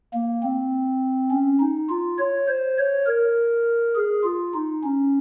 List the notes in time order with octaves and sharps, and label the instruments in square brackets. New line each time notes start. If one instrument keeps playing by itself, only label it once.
[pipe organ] A#3
C4
C#4
D#4
F4
C#5
C5
C#5
A#4
G#4
F4
D#4
C#4